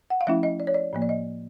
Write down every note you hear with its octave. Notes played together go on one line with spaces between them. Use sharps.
F#5
F5
F3 A3 C#4 E4 E5
D#5
D5
C#5
D5
A2 F3 A#3
D5
D#5